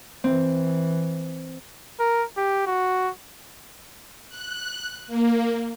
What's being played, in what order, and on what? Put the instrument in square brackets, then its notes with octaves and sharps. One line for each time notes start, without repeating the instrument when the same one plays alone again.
[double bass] E3 [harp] C4
[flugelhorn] A#4
G4
F#4
[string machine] F#6
A#3